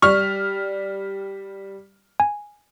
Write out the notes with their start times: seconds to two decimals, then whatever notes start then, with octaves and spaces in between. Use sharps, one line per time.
0.02 G3 C#6 F6
2.20 G#5